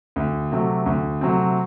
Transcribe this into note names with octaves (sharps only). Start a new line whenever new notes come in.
D2
C3 F#3 A3 C4
D2
C3 F#3 A3 C4